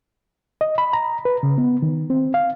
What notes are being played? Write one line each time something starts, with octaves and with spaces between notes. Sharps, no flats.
D#5
B5
A#5
B4
C#3
B3
D#3
C4
F5